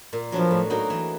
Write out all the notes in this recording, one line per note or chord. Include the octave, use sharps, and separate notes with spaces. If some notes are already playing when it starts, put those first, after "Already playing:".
A#2
F3 F#3 B3 D4 F#4
A2
F#3 A#3 D#4 F#4
E3